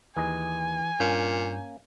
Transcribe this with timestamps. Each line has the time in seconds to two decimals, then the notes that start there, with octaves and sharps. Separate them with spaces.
0.16 D#2 E3 G#4 D#5 G#5
1.00 G2 A#2 A#3 C#4 G6